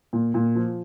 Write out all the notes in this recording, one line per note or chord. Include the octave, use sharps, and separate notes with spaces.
A#2
A#2
F3